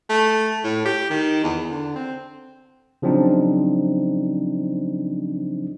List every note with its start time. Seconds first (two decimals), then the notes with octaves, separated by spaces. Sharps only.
0.09 A3
0.64 A2
0.85 G4
1.10 D#3
1.43 E2
1.70 D3
1.95 C4
3.02 C#3 F3 F#3 C4 D4 D#4